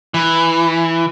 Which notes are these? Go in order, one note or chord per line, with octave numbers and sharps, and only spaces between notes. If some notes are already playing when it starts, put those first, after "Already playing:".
E3